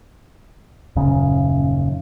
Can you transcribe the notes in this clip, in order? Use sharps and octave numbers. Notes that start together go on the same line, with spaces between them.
D#1 F#2 C#3